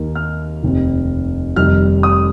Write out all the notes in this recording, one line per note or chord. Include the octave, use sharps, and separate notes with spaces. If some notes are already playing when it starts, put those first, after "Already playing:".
Already playing: D#2 D#3 A#3
F6
F1 D#2 D#3 C4
F1 F2 D#3 G3 F6
D#6